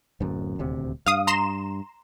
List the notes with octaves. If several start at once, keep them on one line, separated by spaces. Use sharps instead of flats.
D1 F#2
D#1 D2 C3
G2 F5 D#6
A#5 C6 E7